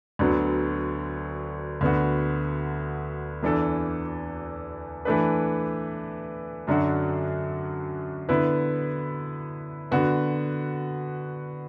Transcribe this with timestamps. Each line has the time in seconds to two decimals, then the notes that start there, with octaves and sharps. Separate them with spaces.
0.19 D2 D3 F#3 B3
1.81 D2 D3 B3 F#4
3.43 E2 E3 D4 A4
5.05 E3 A3 D4 B4
6.67 F#2 D3 F#3 D4 F#4
8.29 D3 B3 E4 B4
9.91 D3 B3 F#4